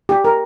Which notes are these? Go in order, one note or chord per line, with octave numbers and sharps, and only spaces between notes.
G4
A#4